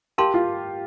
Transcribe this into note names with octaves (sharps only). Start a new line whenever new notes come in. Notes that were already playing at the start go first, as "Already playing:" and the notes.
G4 A#4 F5 A5 C6
F4